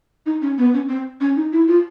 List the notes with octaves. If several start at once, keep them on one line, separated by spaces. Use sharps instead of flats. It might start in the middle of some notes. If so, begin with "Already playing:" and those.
D#4
C#4
B3
C#4
C4
C#4
D#4
E4
F4